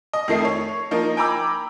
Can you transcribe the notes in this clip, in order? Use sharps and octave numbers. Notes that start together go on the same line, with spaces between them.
D#5
F2 D#3 A3 C7
C#5
F3 A#3 D#4
G5 G#5 A#5 B5 D6 E6